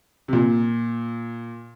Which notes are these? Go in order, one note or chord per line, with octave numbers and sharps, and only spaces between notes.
C3
A#2